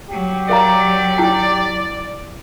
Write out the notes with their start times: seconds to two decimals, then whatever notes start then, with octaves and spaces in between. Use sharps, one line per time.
0.10 F#3 G4
0.49 A#4 D5 F5 A#5
1.18 E4 G5